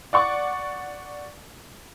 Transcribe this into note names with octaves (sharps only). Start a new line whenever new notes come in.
D5 F#5 C#6 D6